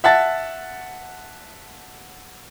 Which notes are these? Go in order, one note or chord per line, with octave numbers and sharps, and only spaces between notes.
E5 F#5 A5 A6